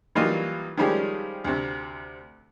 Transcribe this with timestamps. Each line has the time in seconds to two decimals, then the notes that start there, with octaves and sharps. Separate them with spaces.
0.15 E3 F#3 G3 A#3 D#4 F4
0.77 D#3 F3 G3 G#3 C#4
1.44 D2 C3